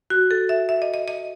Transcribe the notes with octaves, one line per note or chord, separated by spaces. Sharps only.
F#4
A4
E5
E5
D#5
D#5
D#5